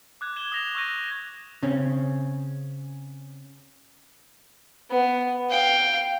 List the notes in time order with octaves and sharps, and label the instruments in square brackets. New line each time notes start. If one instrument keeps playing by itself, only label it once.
[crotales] D6 F#6 G#6
G#6 E7 G7
D#6 A#6 F7
C#6 D#6 E6 G6 A#6 D#7
[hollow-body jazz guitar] C#3 C4 C#4
[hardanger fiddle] B3
F5 G5